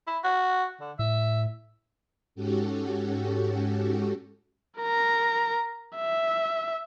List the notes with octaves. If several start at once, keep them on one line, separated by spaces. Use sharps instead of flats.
E4
F#4
D3
A2 E5
G#2 C#4 F#4 G4 A4
A#4 A#5
E5